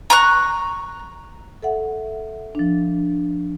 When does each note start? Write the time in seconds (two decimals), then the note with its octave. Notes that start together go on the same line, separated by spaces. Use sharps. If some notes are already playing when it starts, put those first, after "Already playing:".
0.10 A#5 C#6 F#6
1.63 A4 E5 F#5
2.55 F3 D4